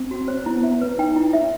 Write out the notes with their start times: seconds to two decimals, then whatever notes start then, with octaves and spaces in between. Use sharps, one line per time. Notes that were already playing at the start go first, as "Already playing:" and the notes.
Already playing: C4
0.11 F#4
0.28 C5
0.46 B3 E4
0.63 E5
0.81 B4
0.98 D#4 G5
1.16 E4
1.33 E5